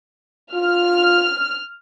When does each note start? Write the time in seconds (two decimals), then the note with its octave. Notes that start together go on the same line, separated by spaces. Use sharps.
0.54 F4 F6